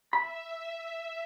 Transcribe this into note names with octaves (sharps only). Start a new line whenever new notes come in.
E5 B5